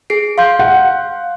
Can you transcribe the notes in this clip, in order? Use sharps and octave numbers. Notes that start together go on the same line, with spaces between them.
G#4 C7 D7
F5 C6 G6
F#5